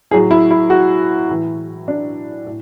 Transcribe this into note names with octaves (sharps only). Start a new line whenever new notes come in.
A2 F#3 G#4
E4
E4
F#4
A2 E3
D4
A2